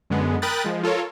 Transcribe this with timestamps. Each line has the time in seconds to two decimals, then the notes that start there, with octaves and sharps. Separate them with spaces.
0.10 F#2 D3 G#3 B3
0.42 A#4 G5 B5 D#6 F#6 A6
0.64 F3 G#3
0.83 F4 A4 A#4 C#5